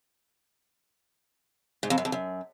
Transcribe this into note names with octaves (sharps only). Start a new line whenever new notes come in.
G#2
F2
F#2
F2
F#2